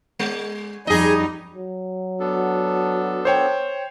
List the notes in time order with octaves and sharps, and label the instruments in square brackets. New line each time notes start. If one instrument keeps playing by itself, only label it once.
[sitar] G#3
[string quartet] F2 G3 D#4 [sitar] G#4 D#5
[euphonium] F#3
[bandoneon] B3 D4 A4
[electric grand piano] C5 C#5 G5